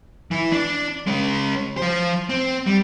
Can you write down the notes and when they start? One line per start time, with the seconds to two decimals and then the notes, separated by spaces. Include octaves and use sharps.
0.31 E3 E4
0.52 D4
1.07 G#3 C#4
1.78 F3 C5
2.29 C4
2.67 G3